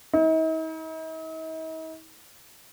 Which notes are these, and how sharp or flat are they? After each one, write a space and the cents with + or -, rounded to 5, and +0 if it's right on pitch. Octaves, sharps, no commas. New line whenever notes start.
D#4 +45